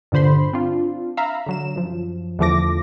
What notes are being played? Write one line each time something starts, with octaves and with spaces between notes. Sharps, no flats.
G2 A#2 D3 C5 B5 C6
C4 D4 F4
E5 F5 A#5 B5
D3 F#3 E7
F#2 F3
E2 D3 F3 A3 D6 A#6